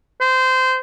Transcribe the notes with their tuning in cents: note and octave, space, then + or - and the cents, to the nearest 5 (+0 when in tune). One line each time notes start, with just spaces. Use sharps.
C5 -20